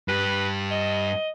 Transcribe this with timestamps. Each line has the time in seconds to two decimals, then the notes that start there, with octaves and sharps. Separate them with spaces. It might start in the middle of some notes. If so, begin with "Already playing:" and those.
0.08 G2 G4 B4
0.71 D#5